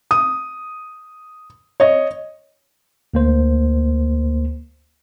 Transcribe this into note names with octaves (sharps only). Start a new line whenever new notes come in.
D#6
C#5 D#5
D2 A#3 C5